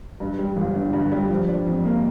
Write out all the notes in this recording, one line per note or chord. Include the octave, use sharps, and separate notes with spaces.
G2
G3
G1
D3
G2
G3
F3
D4
F2
A#3